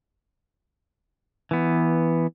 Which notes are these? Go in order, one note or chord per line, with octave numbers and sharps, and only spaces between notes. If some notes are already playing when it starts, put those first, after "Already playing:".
E3 B3